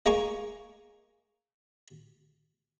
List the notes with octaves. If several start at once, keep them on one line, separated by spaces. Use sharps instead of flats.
G#3 A#3 G#5 A#5 C#6 D#6